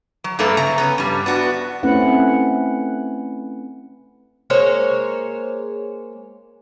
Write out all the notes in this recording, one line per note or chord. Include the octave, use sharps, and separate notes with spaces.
F#3
G2 A3 A#3 A4 B4 A#5
C#3 A#5
B3 C#4
G2 G3
B3 D4 F#4
A3 C4 C#4 E4 B4 F#5
G#3 A#3 C5 C#5